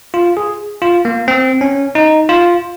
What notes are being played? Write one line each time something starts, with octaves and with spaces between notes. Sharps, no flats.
F4
G#4
F4
A#3
C4
C#4
D#4
F4